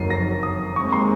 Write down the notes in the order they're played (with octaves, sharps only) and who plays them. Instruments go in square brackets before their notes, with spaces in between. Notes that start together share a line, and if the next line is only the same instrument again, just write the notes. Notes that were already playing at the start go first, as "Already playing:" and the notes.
Already playing: [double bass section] F#1 F2 D#3 F#3 [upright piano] C7 D#7
[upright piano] A#6
D#6
[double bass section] D#2 D#3 G#3 C4 [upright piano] C#6
[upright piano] C6